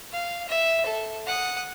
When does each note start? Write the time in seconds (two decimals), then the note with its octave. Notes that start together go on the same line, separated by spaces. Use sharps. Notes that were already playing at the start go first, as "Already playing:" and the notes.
0.12 F5
0.48 E5
0.86 A4
1.27 F#5 D#6